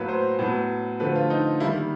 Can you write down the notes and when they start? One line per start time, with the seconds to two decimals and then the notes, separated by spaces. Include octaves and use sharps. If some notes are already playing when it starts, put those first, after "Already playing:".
Already playing: A2 F#3 A#3 B4
0.08 C5
0.39 A2 F#3 B3
1.00 D3 F3 A3 B4
1.15 F4
1.30 D#4
1.60 D#3 G3 A#3 E4